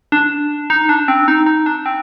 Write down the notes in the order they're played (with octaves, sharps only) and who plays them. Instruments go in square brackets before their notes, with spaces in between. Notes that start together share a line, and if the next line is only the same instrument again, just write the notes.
[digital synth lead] D4
D#4
D4
C4
D#4
D#4
D4
C4